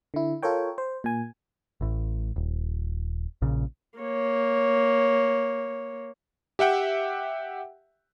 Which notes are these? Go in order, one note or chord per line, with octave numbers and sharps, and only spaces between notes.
D3 E4
F4 A4 A#4 C#5 G5
C5
A#2 G#5
A1 A2
D#1
A#1 A#2 C#3
A#3 C#5
G4 E5 F#5 G5